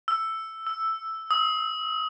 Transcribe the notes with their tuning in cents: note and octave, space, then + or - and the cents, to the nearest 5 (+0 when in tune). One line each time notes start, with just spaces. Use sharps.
E6 +5
E6 +0
D#6 +30